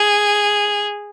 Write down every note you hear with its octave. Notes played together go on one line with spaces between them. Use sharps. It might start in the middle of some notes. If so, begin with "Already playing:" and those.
Already playing: G#4